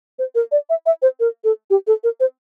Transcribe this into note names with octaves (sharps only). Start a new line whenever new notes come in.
C5
A#4
D5
E5
E5
C5
A#4
A4
G4
A4
A#4
C5